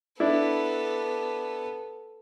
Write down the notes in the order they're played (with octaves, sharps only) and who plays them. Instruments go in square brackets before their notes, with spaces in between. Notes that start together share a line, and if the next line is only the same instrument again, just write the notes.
[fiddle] B3 A4 [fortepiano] D4 E4